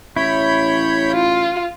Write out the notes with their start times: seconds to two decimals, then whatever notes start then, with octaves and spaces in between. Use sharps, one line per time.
0.16 A1 E4 C#5 B5 G6
1.13 F4